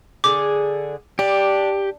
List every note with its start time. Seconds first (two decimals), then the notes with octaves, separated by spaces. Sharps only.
0.24 D3 G#4 D6
1.19 D4 G4